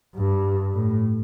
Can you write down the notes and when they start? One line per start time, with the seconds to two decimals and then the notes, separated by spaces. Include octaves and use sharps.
0.16 G2
0.75 A2